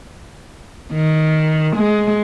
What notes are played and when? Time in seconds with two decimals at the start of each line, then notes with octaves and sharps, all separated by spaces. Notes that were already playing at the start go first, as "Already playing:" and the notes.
0.93 D#3
1.76 G#3